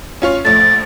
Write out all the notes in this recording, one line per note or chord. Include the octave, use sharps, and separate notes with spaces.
C#4 F4 C#5
A#1 A3 A6